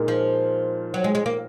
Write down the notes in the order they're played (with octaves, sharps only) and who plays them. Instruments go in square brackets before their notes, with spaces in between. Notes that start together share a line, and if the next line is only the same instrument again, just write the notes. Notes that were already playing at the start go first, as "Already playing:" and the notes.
Already playing: [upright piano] A#2 G#3 D#4 A#4
[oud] F3
F#3
G#3
G#3
A#3